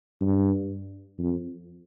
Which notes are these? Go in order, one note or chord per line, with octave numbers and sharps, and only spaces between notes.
G2
F2